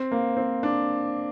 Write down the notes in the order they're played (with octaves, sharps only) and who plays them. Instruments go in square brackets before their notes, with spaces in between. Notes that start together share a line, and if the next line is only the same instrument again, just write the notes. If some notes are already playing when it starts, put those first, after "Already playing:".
Already playing: [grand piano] C4
A#3
C4
D4